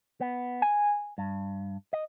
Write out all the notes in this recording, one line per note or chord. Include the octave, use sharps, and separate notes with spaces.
B3
G#5
G2
D#5